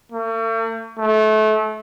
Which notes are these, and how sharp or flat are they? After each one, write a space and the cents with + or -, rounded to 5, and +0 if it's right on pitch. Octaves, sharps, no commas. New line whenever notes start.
A3 +45
A3 -30